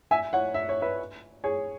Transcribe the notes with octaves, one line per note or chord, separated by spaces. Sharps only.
E5 G#5
C#5 F#5
E5
C#5
B4 E5
G#4 C#5